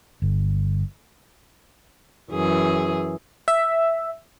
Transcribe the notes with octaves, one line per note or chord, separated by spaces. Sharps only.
G1
F#2 E3 G#4
E5